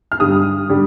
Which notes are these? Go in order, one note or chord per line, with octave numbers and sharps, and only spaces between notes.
F6
G2 D3 G3 D#6
D3 G3